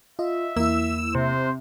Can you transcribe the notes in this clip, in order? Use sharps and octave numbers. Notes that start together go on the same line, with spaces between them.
F4 D#5 E5
E2 A#3 E4 E6
C3 C5